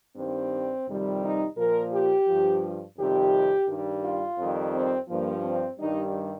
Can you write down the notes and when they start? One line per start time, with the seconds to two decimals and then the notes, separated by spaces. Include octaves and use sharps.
0.16 G2 D#3 G3 C4
0.87 F2 C3 D#3 G3
1.22 D#4
1.57 A#2 F3 A#4
1.93 G4
2.28 G2 F3
2.98 F2 C3 D#3 G3 G4
3.68 G2 D#3 G3
4.03 F4
4.38 F2 D#3 G3
4.74 C4
5.08 G2 F3 A#3
5.44 C4
5.79 G2 D#3 G3 D#4